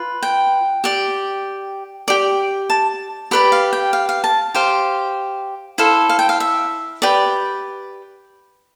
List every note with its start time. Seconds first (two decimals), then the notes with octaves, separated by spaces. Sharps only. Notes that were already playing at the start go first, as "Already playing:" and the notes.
Already playing: F4 B4
0.23 G5
0.84 G4 D5
2.08 G4 D5
2.70 A5
3.31 G4 B4 D5 B5
3.52 F5
3.73 G5
3.93 F5
4.09 F5
4.24 A5
4.55 G4 C5 F5
5.78 E4 A4 C5 F5
6.09 F5
6.19 G5
6.29 F5
6.40 E5
7.02 G4 B4 D5